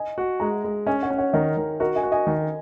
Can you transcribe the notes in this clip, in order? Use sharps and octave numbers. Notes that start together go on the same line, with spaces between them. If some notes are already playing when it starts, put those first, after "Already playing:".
Already playing: D#5 G#5
F#4
G#3 F#5 A#5
G#3
C#4 D#5 G#5
C#5 F#5
C#4
C#5 F#5
D#3 A#4 D#5
D#3
F#4 A#4 D#5
D#5 G#5
F#4
D#5 G#5
D#3